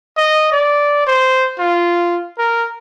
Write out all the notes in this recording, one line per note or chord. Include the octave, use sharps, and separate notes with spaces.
D#5
D5
C5
F4
A#4